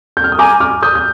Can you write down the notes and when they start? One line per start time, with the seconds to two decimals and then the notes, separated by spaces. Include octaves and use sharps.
0.17 G6
0.24 F6
0.32 D#6
0.39 G#5 A#5 D6
0.60 D6 F6
0.82 D#6 G6
0.95 G6